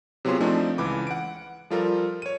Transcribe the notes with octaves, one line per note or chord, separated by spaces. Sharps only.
C3 F#3 B3 F4 G#4 C6
F3 A3 C4 D4 D#4
C#2 E3 B5 D6
F#5 D7
F3 G3 F4 G4 A4 A#4
C#5 D#7